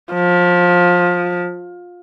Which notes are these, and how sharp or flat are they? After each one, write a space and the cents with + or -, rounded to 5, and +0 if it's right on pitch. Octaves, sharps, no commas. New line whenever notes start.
F3 +20